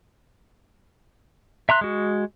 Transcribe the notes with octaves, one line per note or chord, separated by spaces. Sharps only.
E5 A#5 C6 F#6
G#3 F#4